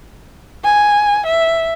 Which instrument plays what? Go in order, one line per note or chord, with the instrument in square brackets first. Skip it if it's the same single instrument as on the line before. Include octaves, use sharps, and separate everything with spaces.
[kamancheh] G#5
E5